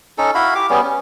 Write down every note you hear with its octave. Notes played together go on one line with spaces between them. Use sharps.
C#4 D#4 A4
E4 F#4 F5 B5
G4 D6
G3 B3 C#4 G#4
C#4